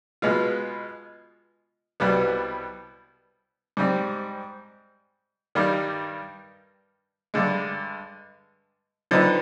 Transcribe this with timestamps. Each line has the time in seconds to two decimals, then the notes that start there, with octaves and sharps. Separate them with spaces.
0.22 B2 G#3 B3 F4
2.00 C2 B2 G3 B3
3.77 G#2 G3 C4
5.55 G2 D#3 G3
7.34 G2 D3 G#3
9.11 D3 F3 C4 D#4 B4